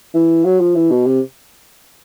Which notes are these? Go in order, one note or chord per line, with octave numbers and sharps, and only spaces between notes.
E3
F#3
F3
E3
B2
C3